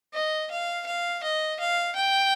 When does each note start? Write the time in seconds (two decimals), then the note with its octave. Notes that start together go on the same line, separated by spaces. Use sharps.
0.14 D#5
0.51 F5
0.87 F5
1.23 D#5
1.60 F5
1.96 G5